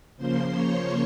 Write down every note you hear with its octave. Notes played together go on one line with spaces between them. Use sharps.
C#3 F3 A#3 C5 C6
C#5 C#6